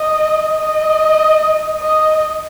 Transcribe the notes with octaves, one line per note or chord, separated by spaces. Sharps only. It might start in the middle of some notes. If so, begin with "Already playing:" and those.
Already playing: D#5
D#5
D#5